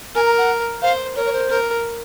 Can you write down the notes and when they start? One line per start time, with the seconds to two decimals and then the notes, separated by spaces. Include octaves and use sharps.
0.15 A#4 G#5
0.26 A#5
0.38 F#5
0.82 C5 F5
1.16 A#4 C#5
1.26 C#5
1.33 C5
1.50 A#4